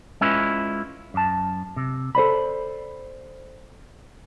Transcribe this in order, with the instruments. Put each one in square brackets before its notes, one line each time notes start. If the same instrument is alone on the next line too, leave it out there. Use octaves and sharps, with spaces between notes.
[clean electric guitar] G#3 C#4 E4 F4 B4
F#2 A5
C3
A4 C5 D5 B5